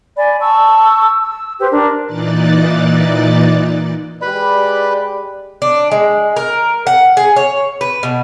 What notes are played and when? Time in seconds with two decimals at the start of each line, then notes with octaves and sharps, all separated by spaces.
0.17 D5 G#5 B5
0.40 A5 C#6 E6
1.21 E6
1.59 G4 B4 C5
1.72 D4 A#4
2.06 A#2 E3 D#4 D5 F#6 A6
4.22 G#3 G4 B4 D5 B5
5.62 D4
5.92 G#3
6.36 A#4
6.87 F#5
7.17 G#4
7.36 C#5
7.81 B4
8.03 B2